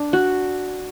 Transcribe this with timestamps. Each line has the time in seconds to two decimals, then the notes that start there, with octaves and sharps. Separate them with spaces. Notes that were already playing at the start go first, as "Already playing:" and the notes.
Already playing: D4
0.13 F#4